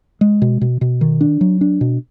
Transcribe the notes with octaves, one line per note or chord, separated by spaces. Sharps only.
G#3
B2
B2
B2
D#3
D4
F#3
D4
B2